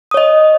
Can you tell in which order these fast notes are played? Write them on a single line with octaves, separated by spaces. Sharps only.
D#6 C#5 D#5